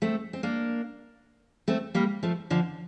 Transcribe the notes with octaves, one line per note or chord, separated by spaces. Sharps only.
A3 C4
C4
A#3 D4
A3 C4
G3 A#3
F3 A3
D3 F3